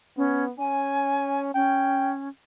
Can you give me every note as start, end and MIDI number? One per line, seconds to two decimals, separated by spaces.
0.17 0.52 59
0.17 0.44 61
0.59 1.51 61
0.59 1.41 80
1.54 2.28 61
1.54 2.12 79